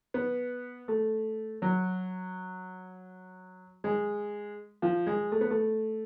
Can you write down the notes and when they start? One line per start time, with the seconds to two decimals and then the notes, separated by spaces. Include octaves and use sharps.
0.14 B3
0.88 A3
1.62 F#3
3.84 G#3
4.82 F3
5.07 G#3
5.32 A3
5.41 B3
5.50 A3